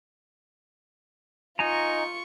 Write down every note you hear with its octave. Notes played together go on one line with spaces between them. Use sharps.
D#4 F4 G#5 A#5 C#6